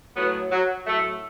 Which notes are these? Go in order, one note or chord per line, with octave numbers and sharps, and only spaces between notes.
A2 F#3 B3
F#3
A2 F#3 A3